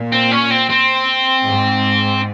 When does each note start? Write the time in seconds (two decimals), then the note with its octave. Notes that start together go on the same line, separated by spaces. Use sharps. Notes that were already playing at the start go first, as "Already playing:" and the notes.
Already playing: A#2
0.12 C4
0.31 C#4
0.50 C4
0.70 C4
1.47 G#2